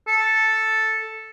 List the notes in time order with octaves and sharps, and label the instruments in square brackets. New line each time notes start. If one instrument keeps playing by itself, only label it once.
[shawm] A4